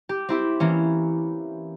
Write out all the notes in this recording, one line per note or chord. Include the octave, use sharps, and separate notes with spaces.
G4
C4 E4 G4
E3 A#3 C#4